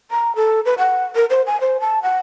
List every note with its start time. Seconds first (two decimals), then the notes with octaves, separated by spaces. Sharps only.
0.11 A#5
0.36 A4
0.65 B4
0.78 F#5
1.15 A#4
1.30 C5
1.47 G#5
1.61 C5
1.80 A5
2.03 F#5